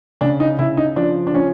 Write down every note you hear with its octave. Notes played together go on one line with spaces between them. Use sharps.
C#3 D4
D#4
C#3 E4
D#4
F3 D4
D4
F3 C#4